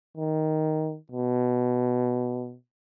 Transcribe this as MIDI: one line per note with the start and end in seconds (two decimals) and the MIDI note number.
0.17 0.97 51
1.12 2.56 47